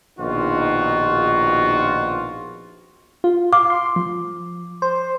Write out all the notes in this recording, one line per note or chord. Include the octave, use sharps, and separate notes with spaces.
A#1 B2 D#3 D#4 F4 F#4
F4
F5 D6
C6
F3
C5